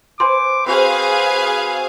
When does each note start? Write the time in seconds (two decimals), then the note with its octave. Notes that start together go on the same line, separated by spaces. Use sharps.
0.20 B4 C5 G#5 C6 D6
0.67 C4 F#4 G#4 B4 C5 F5